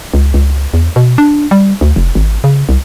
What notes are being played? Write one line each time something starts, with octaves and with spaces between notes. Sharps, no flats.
C#2
C#2
E2
B2
D4
G3
D2
F1
G#1
C#3
C2